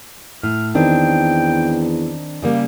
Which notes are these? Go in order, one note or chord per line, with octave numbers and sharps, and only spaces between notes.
A2 F6
E2 D#3 C4 D4 G5
C#3 G3 A#3 G4